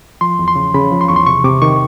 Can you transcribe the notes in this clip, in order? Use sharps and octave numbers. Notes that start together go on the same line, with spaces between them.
F3 C6
E2
C6
C#3
C#3 B5
F3
C6
E2 C#6
C6
C3 C#6
C3 D6
D#3 C#6